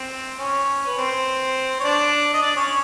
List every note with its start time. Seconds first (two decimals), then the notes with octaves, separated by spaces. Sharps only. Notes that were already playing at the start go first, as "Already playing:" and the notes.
Already playing: C4 C5
0.39 C#4 C#5
0.86 B4
0.98 C4 C5
1.80 C#5
1.84 D4 D5
2.34 D#5
2.42 D4 D5
2.56 C#4 C#5